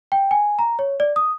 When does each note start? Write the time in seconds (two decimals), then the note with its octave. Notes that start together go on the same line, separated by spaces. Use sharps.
0.12 G5
0.31 G#5
0.59 A#5
0.79 C#5
1.00 D5
1.16 D#6